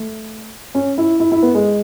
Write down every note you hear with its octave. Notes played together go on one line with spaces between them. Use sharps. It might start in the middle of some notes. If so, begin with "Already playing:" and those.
Already playing: A3
C#4
E4
E4
E4
B3
G#3